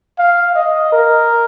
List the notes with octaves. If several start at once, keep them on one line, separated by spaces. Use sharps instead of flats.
F5
D#5
A#4